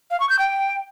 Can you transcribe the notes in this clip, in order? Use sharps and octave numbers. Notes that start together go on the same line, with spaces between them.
F5
C#6
G6
G5